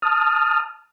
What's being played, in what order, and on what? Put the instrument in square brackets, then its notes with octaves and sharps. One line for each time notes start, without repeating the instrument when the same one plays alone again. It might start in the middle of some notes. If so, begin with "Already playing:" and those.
[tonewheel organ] A5 D#6 F6